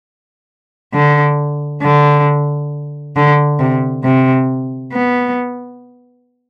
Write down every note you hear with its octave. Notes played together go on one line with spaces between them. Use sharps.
D3
D3
D3
C3
C3
B3